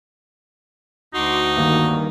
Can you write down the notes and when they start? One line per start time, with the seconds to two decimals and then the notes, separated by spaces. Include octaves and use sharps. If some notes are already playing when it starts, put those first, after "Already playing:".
1.14 D2 D#4 F#4 C6 D6 C7
1.56 G2 D#3 A#3